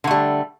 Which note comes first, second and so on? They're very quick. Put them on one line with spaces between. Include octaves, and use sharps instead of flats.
D3 A3 G3